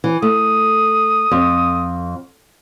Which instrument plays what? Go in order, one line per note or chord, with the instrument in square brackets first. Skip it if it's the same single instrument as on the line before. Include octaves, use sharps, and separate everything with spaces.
[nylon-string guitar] E3
[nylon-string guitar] A3 [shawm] D#6
[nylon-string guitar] F2